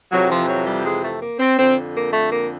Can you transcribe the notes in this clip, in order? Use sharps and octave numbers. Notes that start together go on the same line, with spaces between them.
F2 C3 E3 F#3
F3
F#3
G3
G#3
A3
A#3
C4
F2 D3 C4
A#3
A3
A#3